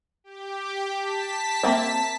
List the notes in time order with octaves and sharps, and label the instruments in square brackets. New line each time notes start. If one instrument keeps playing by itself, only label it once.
[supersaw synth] G4
A5 B6
[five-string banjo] A#3 C4 E5